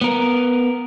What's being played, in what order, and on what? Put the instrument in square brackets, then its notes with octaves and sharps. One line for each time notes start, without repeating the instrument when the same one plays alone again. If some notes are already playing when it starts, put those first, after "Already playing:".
[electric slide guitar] B3 A#4